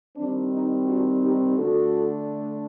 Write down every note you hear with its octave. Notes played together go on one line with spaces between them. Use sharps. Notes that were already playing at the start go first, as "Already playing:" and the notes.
D#3 G3 C4 D4
D#4
D4 F#4
D#4 G4
D3 A3 D4 F#4 A4